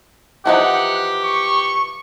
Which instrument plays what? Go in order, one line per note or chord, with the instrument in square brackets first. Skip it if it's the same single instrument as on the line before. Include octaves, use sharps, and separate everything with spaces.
[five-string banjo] E3 F3 D#4 [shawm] G4 [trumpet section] F#5
[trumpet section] C#6